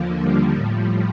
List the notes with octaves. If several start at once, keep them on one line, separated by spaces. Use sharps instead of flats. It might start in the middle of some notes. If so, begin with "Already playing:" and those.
Already playing: D#2 D3 F3 A#3
G3
A2 F3